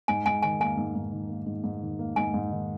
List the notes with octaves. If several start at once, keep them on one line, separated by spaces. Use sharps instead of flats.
G#2 G#5
G#2 G#5
D#3 G#5
A#3 G#5
G#2
G#2
D#3
A#3
G#2
G#2
D#3
A#3
G#2 G#5
G#2
D#3